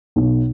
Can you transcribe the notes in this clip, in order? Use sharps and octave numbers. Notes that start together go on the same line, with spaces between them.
B1